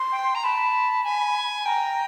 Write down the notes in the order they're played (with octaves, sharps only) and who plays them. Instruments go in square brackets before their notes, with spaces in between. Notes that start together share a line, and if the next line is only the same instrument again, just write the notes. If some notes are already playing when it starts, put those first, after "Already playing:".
Already playing: [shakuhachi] C6
[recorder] G5
A#5
[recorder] A5 [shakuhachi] B5
[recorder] G#5
[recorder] G5 [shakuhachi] A#5